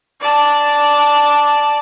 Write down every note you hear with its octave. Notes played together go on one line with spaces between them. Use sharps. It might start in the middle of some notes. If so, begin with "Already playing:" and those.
D5 A5